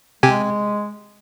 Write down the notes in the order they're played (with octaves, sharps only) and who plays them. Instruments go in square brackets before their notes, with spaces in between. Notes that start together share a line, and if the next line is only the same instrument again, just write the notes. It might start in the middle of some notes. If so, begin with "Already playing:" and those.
[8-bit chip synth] C3 G4 G#5 [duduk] G#3